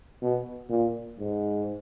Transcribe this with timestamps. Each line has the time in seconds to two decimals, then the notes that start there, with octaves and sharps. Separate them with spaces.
0.22 B2
0.70 A#2
1.20 G#2